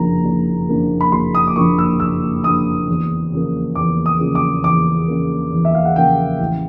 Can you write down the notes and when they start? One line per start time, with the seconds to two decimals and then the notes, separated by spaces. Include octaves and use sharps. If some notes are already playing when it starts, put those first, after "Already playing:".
Already playing: F#1 F2 D3 F3 A#3 A#5
0.25 F#1
0.69 F2 D3 F3 A#3
1.01 B5
1.12 F#1 C6
1.35 D#6
1.47 D6
1.56 F2 D3 F3 A#3 C#6
1.78 E6
2.00 F#1 E6
2.44 F2 D3 F3 A#3 D#6
2.88 E2
3.32 C#3 F3 A#3
3.75 E2 D6
4.06 D#6
4.20 C#3 F3 A#3
4.35 D6
4.63 E2 D6
5.08 C#3 F3 A#3
5.52 E2
5.65 E5
5.75 F5
5.85 F#5
5.96 C#3 F3 A#3 G5
6.40 A1